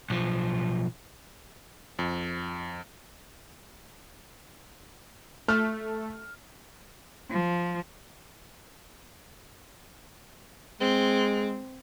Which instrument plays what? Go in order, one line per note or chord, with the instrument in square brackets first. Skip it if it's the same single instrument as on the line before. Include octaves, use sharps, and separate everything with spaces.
[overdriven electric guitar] B1 F3
[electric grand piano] F2
[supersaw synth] A3 [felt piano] F6
[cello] F3
[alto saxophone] G#3 [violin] C4